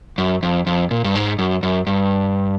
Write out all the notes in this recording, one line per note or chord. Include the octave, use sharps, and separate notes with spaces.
F#2
F2
F2
A#2
G2
G#2
F#2
F#2
G2